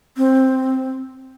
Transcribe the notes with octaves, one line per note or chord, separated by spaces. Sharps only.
C4